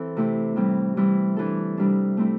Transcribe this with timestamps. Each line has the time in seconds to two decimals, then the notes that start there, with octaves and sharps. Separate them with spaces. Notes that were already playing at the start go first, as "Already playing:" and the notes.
Already playing: E3 C4 A4
0.17 C3 A3 E4 G4 C5
0.56 A2 E3 G3 C4 G4
0.97 E3 G3 C4 E4
1.37 E3 G3 D4 A4
1.77 C3 G3 D4
2.17 A3 C4 E4